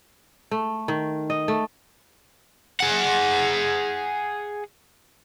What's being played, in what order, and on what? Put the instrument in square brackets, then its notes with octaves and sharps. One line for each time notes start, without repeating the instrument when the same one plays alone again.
[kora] A3
D#3
D#5
A3
[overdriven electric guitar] G#4 F#5